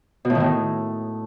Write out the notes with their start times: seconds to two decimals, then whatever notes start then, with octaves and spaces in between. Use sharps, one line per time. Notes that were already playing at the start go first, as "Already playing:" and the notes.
0.25 B2
0.30 A2
0.35 D#3
0.40 A2